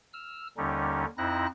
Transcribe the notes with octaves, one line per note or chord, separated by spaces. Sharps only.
E6 F6
D#2 D3 G3 C#4 D#4
F2 C4 D#4 E4 F#6 A#6